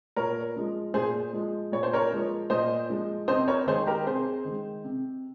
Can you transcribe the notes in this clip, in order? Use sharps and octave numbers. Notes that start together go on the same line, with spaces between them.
A#2 A#4 C#5
F3 G#3
A#2 G#4 C5
F3 G#3
A#2 C#5
C5
A#4 C#5
F3 G#3
A#2 C5 D#5
F3 G#3
C3 C5 D#5
A#4 C#5
D#3 G#3 G#4 C5
G4 A#4
C3 G#4 C5
D#3 G#3
C3